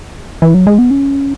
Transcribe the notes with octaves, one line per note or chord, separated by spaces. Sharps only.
E3
F#3
G#3
B3
C#4